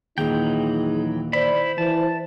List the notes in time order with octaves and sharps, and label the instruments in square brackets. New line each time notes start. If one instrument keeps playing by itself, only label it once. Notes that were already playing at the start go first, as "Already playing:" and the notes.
[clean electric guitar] D#2 A#2 [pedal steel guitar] E3 F#3 G5 [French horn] D#4 [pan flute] G#4
[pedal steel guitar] E4 B5 [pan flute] C5 [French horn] D5
[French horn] E3 [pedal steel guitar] A5